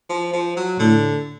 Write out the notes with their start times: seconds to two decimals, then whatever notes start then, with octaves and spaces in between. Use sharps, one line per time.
0.09 F3
0.33 F3
0.56 F#3
0.79 A2 D3